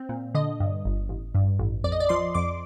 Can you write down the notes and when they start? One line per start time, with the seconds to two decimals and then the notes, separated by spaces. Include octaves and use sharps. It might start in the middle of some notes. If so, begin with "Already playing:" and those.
Already playing: C4
0.09 A#2
0.35 D3 D#5
0.60 G2
0.85 G1
1.09 A1
1.35 G2
1.59 A1
1.84 F2 D5
1.92 D#5
2.00 D5
2.09 F3 C6
2.34 F2 D6